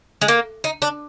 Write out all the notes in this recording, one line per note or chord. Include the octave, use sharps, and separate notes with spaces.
G#3
A#3
D#4
D4